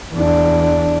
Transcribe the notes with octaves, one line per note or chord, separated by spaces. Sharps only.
E2 D4